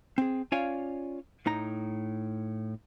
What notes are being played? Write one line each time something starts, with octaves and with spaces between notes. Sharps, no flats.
C4 G#4
C#4 F4 C#5 D5 F5 G#5
A2 D#4 A#5